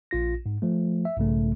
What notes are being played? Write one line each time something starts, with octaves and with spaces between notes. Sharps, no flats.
A#1 F4 A#6
G#2
F3 A3
E5
B1 G#2 C#3 A3